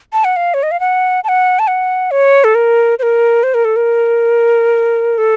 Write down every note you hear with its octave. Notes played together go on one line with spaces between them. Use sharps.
A5
F#5
F5
C#5
D#5
F5
F#5
A5
F#5
A5
F#5
C#5
A4
A#4
C5
A#4
C5
A#4
A4
A#4
A4